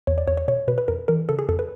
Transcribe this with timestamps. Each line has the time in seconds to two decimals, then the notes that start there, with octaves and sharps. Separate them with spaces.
0.07 E2 C#5
0.18 D5
0.27 E2 C#5
0.37 C#5
0.48 B2 C#5
0.68 B2 B4
0.78 B4
0.88 F2 A#4
1.08 E3 A#4
1.29 C#3 A4
1.39 G#4
1.49 F2 A4
1.59 B4